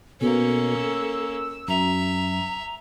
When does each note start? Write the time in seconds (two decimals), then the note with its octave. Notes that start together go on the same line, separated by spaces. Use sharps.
0.21 B2 A#3 C#4 A4
0.76 E6
1.68 F#2 E5 A#5